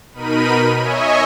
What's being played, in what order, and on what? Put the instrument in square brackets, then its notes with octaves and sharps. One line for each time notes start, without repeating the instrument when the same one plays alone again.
[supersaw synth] B2 D#4 A#4 B5 D#7
C#5 D#5 E5 G#5 C#6